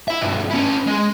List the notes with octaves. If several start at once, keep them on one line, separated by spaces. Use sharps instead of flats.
E4 E5
B1 G2
C#4 E4
G#3